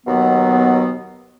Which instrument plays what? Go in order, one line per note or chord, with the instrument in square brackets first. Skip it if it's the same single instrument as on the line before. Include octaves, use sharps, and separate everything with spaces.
[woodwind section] D#2 B2 F#3 B3